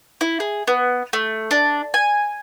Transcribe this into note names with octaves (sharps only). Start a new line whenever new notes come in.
E4
G#4
B3
A3
D4
G#5